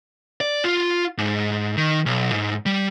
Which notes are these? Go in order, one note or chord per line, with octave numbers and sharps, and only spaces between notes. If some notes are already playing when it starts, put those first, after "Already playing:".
D5
F4
G#2
D#3
B1
G#2
G3